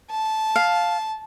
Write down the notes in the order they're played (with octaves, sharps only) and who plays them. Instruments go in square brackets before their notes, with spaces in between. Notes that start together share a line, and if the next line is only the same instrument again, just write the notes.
[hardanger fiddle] A5
[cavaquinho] F5